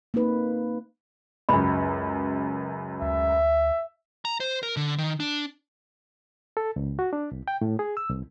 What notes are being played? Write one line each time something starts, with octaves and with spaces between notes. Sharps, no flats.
A#3 C4 D#4 B4
C#2 F#2 B5
D2 E5
A#5
C5
A#4
D3
D#3
D4
A4
C#2
F#4
D4
C2
G5
A2
G#4
E6
C2